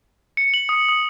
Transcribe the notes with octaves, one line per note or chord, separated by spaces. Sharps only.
C#7
F#7
D#6
D#6